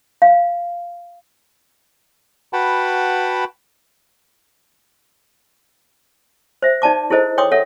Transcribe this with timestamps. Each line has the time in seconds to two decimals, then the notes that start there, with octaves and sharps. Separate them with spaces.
0.22 F5
2.53 F#4 B4 F#5 G5 A5 B5
6.62 C5 E5
6.82 D#4 D5 A5 D6
7.10 E4 G#4 A4 C5 D#5
7.38 C#5 G5 C6 D6 D#6
7.52 A4 C#5 E5 F#5